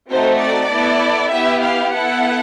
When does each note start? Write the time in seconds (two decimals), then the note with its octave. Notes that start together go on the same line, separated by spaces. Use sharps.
0.11 A3 C4 D#4 F#4 C5
0.41 D5
0.71 B3 E4 A4
1.32 B3 E4 G4 E5
1.63 F5
1.94 B3 E4 A4 F#5